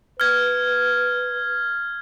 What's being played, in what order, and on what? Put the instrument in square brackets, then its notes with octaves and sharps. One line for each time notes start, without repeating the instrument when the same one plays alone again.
[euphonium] B4 [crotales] F6 G#6